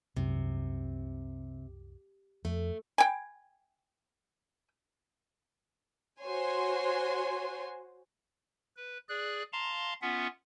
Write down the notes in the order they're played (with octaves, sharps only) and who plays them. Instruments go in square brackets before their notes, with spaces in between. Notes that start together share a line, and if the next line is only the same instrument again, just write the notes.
[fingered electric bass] C2 F#2 [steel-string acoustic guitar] C3
[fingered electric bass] F2 [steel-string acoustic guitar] A3
[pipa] G5 G#5
[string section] F#4 C5 C#5 G#5 C6
[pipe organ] B4
G#4 D5 F#6
F5 A5 A#5 C6
B3 C#4 F4 E5 F#5